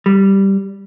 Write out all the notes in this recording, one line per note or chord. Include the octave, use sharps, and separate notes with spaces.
G3